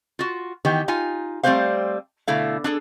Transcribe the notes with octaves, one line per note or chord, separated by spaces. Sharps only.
F4 F#4
D#3 E3 B3 G4
D#4 F4 G#5
G3 A3 C4 B4 C5 F5
B2 D3 A3 E4 F5
D4 G#4 A4